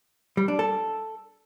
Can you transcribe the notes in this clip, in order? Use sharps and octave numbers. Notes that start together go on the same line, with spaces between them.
G3
D4
A4